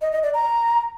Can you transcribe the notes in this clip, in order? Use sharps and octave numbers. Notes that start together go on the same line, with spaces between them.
D#5
D#5
D5
A#5